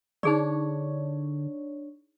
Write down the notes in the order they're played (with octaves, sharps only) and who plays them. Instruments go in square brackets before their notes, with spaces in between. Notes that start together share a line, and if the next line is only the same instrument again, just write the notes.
[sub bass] D3 [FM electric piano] D4 C#5 [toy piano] D#4 G#4 D5